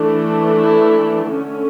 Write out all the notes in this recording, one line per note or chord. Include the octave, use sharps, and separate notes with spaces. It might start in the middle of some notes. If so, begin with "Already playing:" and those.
Already playing: E3 A3 D4
E4
D3 A3 C#4